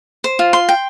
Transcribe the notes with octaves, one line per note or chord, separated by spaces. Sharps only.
C5
F4
C6
G5